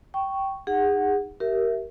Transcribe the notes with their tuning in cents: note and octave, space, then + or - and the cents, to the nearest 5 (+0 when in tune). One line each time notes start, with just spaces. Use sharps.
G5 -10 C#6 +0
D#4 +0 G#4 -30 F#5 +0
G4 -25 A#4 +0 E5 +0